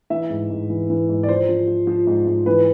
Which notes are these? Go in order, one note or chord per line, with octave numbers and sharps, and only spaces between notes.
E3 E5
G#2
G#2
E3
E3
G#2
D5
F3 C5
F3
F3
F3
G#2
G#2
E3 B4